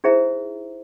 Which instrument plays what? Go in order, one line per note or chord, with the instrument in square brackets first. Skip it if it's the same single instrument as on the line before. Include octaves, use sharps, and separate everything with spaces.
[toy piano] D#4 E4 G#4 C5 E5 A#5